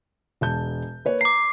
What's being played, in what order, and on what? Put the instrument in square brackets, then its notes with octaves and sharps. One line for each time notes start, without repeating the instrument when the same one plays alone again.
[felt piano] E1 A5 G6
A#3 B4 C#5
[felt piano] A#5 [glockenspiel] D6 C7